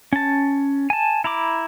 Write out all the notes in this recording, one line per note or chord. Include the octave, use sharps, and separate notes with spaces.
C#4 A5
G#5 A5
E4 A#5 B5 D6